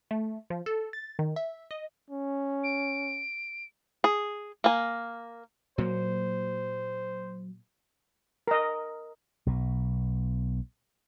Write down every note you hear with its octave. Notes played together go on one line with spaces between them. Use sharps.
A3
F3
A4
A6
D#3
E5
D#5
C#4
D7
G#4
A#3 G#5
A#2 F#3 A#3 C5
A#4 D#5
B1 B2